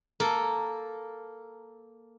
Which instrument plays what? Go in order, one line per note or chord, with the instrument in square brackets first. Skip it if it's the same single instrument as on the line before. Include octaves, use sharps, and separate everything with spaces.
[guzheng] A#3 A4 A#4